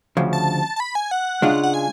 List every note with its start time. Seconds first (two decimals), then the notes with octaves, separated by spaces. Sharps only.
0.17 D2 C#3 F3
0.33 A5
0.76 A5
0.80 B5
0.95 G#5
1.11 F#5
1.42 C#3 G#3 D4 F4
1.63 F#5
1.74 G#5